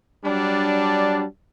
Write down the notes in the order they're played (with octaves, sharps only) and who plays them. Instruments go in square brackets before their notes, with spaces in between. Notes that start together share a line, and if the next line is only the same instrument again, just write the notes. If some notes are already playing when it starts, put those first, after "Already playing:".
[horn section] F#3 G3 D4